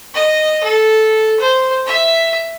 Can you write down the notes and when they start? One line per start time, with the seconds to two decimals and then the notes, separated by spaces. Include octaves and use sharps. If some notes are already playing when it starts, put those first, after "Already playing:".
0.14 D#5
0.63 A4
1.40 C5
1.86 E5